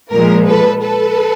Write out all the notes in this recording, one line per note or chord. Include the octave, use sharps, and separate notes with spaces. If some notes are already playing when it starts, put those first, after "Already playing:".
A#2 F3 G#3 A#4
A4 B4
A4 B4